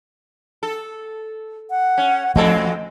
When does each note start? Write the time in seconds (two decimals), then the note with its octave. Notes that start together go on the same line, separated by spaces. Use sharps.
0.63 A4
1.70 F#5
1.98 C#4
2.36 F2 F3 A3 C4 A4 D#5